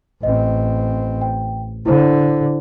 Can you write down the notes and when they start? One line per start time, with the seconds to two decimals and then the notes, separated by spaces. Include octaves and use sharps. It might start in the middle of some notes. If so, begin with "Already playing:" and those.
0.23 A1 C4 D#5
1.22 G5
1.86 D3 E4 C5